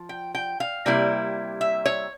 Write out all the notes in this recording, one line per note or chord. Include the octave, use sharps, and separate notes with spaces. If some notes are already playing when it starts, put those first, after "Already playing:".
Already playing: F3
G5
G5
F5
C3 G3 A#3 E4
E5
C#5